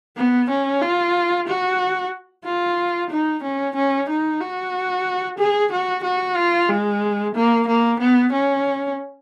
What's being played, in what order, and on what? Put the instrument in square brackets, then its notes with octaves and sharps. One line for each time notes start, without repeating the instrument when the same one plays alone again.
[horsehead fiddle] B3
C#4
F4
F#4
F4
D#4
C#4
C#4
D#4
F#4
G#4
F#4
F#4
F4
G#3
A#3
A#3
B3
C#4